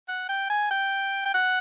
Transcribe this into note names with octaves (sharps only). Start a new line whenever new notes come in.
F#5
G5
G#5
G5
G5
F#5